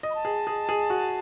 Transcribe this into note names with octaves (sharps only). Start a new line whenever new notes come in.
D#5
B5
A5
G#4
G#4
G#4
F#4